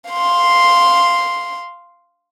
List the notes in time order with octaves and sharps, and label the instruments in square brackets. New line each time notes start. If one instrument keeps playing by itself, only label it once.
[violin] F5 C6